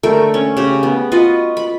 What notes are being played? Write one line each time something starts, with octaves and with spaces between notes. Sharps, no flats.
D3 A3 A#4 G5
C#4
C#3 G4
B3
F4 F#4 B4 D#5
B5